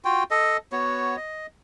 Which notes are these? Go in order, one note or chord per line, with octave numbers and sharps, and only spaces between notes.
F4 F#4 G5
A4 D#5
B3 F#4 C#5
D#5